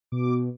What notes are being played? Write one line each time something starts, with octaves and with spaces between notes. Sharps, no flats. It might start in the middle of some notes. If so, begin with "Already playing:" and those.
B2 D6